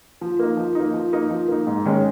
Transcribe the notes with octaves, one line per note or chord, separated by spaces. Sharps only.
F3
A#3 D#4
F3
A#3 D#4
F3
A#3 D#4
F3
A#3 D#4
G#2
D#3 G#3 C#4